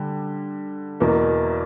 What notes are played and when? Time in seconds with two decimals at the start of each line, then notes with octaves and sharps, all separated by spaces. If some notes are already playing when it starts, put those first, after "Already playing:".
Already playing: D3 G3
1.00 E2 B2 A#3